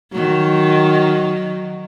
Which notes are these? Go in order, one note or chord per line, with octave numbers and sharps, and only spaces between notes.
D#3 F#3